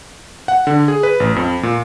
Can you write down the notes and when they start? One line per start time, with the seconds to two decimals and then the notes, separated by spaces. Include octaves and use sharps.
0.48 F#5
0.67 D3
0.88 G#4
1.03 B4
1.20 A1
1.36 F2
1.63 A#2